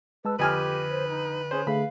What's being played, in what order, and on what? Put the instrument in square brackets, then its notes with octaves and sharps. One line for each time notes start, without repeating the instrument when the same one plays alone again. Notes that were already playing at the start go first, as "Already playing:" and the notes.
[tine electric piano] G#3 A5 E6 [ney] B4
[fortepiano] F2 G#5 F6 [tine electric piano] D3 [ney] G4 [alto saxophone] B4
[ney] C5
D#4
[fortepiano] C#4 C5 [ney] G#4
[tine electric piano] D3 A3 G#4 [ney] F5 [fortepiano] B5